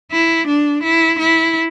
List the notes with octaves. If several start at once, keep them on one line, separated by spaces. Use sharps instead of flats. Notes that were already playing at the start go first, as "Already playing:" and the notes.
E4
D4
E4
E4